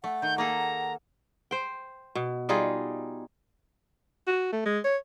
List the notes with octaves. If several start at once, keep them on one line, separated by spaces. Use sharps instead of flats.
A3 F#5
D#3 G6
A#3 G#4 A4 A#5
C5 G5
B2
G3 D#4 F4 G#4
F#4
A3
G#3
C#5